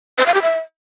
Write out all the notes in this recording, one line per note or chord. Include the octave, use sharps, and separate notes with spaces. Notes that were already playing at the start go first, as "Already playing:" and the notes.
C5
F5
G4
E5